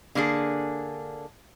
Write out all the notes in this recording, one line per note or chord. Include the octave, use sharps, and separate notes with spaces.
D3 A#3 D4 G#4